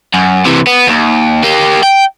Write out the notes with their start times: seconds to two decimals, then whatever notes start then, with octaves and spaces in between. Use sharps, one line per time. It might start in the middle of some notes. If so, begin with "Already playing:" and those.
0.14 F#2
0.45 C3 E3
0.67 B3
0.87 D#2
1.44 A#3 G4
1.83 G5